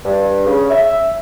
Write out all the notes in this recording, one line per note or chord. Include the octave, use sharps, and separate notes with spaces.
G2
C#3
E5